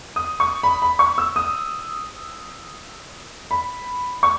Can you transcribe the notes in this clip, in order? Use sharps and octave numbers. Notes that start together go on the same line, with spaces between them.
D#6
C#6
B5
B5
C#6
E6
D#6
B5
C#6